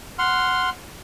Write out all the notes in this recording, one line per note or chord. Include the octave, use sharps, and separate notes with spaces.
F#5 C6 F6